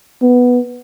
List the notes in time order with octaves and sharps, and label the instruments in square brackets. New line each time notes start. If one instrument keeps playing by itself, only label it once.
[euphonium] B3